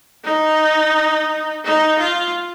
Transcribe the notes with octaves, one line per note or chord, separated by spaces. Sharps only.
D#4
D#4
F4